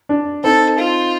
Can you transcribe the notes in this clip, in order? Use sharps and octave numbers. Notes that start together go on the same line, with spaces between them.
D4
C4 D#4 A4
F4